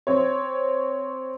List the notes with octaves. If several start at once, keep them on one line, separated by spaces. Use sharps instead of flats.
C4 C#5